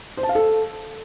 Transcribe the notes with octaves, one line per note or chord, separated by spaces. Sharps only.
C5
A5
F5
A4